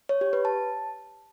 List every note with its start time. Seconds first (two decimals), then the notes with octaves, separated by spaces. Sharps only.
0.09 C#5
0.21 G4
0.33 B4
0.45 A5